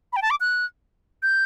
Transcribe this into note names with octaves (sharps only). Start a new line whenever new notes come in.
B5
G5
A5
D6
F#6
G6